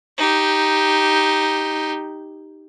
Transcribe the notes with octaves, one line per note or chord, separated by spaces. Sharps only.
D#4 G4